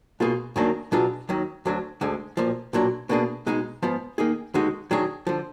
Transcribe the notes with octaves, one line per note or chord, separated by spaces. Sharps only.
B1 B2 A#3 F4 G#4
F#2 D#3 F#3 A#3 D4
B2 F#3 D4 F4 G#4
D#2 D#3 F#3
D2 D3 F#3 D4
D2 D3 G#3
B1 A#2 F3
B1 A#2 F#3 D4
B2 A#3 D4 G#4
B2 G#3 D#4 G#4
G#2 F3 B3 F4
D#3 A#3 D#4 G#4
D#2 D3 G#3 D#4 F#4
D#3 F#3 D4 G#4
D3 F3